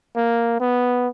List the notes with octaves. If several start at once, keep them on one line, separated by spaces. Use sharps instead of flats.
A#3
B3